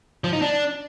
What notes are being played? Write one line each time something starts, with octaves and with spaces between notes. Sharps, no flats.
F3
D#4
D4